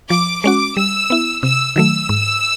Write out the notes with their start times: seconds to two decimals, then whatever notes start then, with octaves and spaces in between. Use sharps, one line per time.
0.10 F3 D6
0.44 G#3 C#4 F#4 D6
0.77 G3 E6
1.10 B3 E4
1.43 C3 E6
1.76 D#3 F#3 A3 E6
2.09 G#2